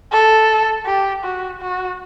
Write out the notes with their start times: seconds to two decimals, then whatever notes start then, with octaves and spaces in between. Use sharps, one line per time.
0.13 A4
0.87 G4
1.24 F#4
1.61 F#4